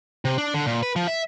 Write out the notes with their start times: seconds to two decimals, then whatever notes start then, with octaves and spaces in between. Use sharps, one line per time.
0.25 C3
0.38 D4
0.54 D3
0.66 A#2
0.83 B4
0.96 F3
1.08 E5